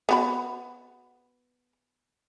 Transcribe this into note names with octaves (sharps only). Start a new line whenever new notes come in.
B3 F#4 B5